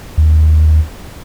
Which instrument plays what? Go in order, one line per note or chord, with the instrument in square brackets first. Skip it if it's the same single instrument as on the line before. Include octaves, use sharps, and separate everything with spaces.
[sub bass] D#2